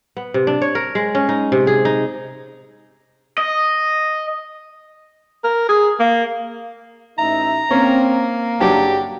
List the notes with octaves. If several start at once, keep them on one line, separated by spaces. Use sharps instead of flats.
B3
C3
D4
C#5
A#4
G#3
C#4
D#4
C3
G#4
D#4
D#5
A#4
G#4
A#3
A1 D#4 E5 A#5
A#3 C4 C#4
F#1 C#3 F#3 G3 D4 G4 A#5